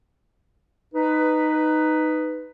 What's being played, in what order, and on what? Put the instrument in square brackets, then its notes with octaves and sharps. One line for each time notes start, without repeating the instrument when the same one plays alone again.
[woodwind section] D#4 B4